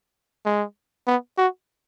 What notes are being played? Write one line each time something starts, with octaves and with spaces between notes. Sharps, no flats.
G#3
B3
F#4